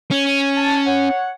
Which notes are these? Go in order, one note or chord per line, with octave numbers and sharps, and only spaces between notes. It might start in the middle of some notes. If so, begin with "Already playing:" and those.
C#4
A5
C#5 F#5